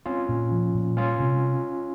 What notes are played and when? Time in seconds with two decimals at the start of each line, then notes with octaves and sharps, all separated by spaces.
0.06 C4 C#4 F4
0.29 A#2
0.51 F3
0.75 A#2
0.97 G3 C#4 F4
1.20 C3